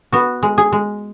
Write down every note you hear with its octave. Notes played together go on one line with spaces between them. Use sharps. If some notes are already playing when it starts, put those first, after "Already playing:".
B3 F#4
G#3
G#4
G#3